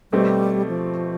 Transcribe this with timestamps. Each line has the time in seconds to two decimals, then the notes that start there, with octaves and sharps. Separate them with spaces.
0.12 B2 G3 A3 C4 G4
0.68 F3